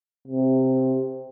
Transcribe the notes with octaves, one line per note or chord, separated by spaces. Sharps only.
C3